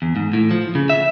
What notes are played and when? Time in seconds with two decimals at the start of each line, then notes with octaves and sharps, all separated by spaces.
0.02 E2
0.16 G#2
0.33 A2
0.51 F3
0.75 C#3
0.89 E5